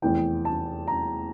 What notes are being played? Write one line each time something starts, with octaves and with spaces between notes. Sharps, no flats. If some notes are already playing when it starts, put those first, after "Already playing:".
F1 E2 E3 G5
A5
A#5